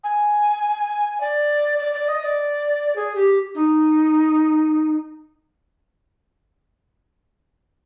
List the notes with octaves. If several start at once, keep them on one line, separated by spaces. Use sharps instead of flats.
G#5
D5
D5
D5
D#5
D5
G#4
G4
D#4